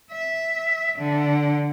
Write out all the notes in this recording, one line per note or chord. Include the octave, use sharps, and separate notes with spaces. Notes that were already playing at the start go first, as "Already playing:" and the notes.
E5
D3